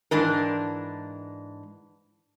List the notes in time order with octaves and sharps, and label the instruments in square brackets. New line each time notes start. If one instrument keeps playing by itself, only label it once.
[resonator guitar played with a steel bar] G#2 E3 D4 A#4